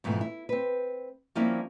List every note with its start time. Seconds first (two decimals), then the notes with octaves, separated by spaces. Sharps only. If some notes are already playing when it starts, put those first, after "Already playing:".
0.04 F2 G#2 B2 E3 A3
0.21 E4
0.49 C4 B4
1.35 F3 G3 A#3 C4 C#4 E4